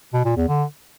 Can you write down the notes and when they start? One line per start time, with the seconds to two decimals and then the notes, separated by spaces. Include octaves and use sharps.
0.14 B2
0.25 A#2
0.37 E2
0.48 D3